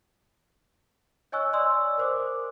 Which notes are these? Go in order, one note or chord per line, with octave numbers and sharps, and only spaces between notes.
C#5 D#5 G#5 C#6 E6 F#6
D5 G#5 C6 D#6 E6
A#4 C5 D6